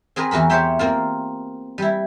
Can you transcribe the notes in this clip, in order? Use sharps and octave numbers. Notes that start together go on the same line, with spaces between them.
C4 G#4 A#4 B4
E2 F#4 A#4 B5
G4 C5 C#5 E5 G5
A#3 C4 F4
G3 E4